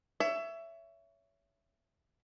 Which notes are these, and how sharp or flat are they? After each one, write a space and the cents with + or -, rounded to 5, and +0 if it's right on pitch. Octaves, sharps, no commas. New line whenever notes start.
C#5 +25 E5 +15